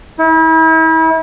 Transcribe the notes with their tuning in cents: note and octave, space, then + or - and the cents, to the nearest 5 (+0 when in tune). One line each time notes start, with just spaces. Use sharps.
E4 -35